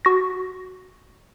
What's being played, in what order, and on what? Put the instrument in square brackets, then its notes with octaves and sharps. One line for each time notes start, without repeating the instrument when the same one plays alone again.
[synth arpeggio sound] F#4 A#6